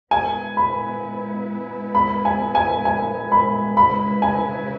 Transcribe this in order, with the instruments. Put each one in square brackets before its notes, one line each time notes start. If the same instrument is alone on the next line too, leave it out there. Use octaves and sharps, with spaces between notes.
[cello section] G#3 B3 E4 B4 [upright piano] G#5
[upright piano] B5
B5
G#5
G#5
G#5
B5
[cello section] C#3 G#3 E4 B4 [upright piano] B5
[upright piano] G#5